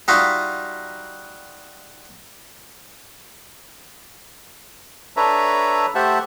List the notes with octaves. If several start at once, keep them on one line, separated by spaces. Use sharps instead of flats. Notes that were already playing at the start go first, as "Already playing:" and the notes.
G3 D#4 F4 F#4 D#5 E5
D4 A4 B4 C#5 E5 A#5
A3 G4 C5 E5 F#5 A5